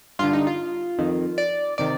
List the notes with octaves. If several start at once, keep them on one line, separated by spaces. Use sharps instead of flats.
G2 D3 F4
D#4
F4
F2 D#3
D5
C3 D#3 D5